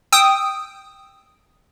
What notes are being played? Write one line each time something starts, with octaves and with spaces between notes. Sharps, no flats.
G5 D#6 E6